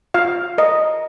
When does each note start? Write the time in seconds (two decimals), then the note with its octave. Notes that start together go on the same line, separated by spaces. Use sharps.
0.14 F4 F5
0.58 A#4 D#5